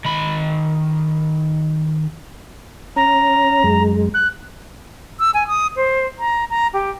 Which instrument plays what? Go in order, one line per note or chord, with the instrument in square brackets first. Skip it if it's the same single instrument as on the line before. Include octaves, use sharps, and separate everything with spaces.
[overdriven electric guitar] D#3 B5
[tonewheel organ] C#4 [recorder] A#5
[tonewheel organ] F#2 G#3
[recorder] F#6
[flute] E6
G#5
D#6
C5
A#5
A#5
G4